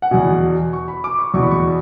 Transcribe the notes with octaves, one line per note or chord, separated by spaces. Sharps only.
F#5
E2 B2 G#5
C#6
B5
D6
C#6
E2 B2 C#6
B5
C#6